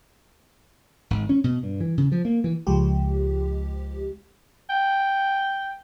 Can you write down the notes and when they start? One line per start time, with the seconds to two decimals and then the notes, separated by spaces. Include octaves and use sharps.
1.11 G#1
1.29 C#4
1.44 B2
1.63 G2
1.81 E3
1.98 C#3
2.12 F3
2.25 A#3
2.44 E3
2.67 C#2 F3 G#3 G4
4.70 G5